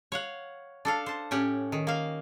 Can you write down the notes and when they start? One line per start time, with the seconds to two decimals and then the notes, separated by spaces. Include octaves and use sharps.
0.12 C#5 F5 F#5
0.85 D4 A4 F5
1.06 C5 A5
1.31 A2 C#4 G4 F#5
1.72 D#3
1.87 A#3 F5